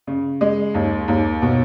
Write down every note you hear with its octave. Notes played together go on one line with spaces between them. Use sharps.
C#3
G#3
D#2
D#2
B2